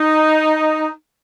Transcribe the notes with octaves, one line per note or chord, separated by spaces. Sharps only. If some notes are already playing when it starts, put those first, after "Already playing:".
Already playing: D#4